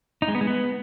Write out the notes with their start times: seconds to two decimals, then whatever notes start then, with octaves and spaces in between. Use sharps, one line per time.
0.22 D#4
0.28 G#3
0.35 B3
0.41 G#3
0.47 B3